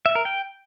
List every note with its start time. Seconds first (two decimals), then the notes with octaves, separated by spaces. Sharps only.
0.06 E5
0.15 A#4
0.25 G5